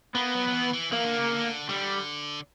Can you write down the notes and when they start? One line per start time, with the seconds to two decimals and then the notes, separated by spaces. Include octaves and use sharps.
0.15 A#3 B3
0.35 F#3
0.48 F#3
0.53 E3
0.74 E3
0.92 E3 A#3
1.05 D3
1.18 C#3
1.32 D3
1.69 D3 G3